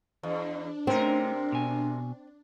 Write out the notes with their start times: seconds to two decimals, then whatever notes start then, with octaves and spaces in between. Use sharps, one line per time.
0.23 E2 D4
0.87 C3 A3 C4 C#4 D#4 A#4
1.52 B2 G#5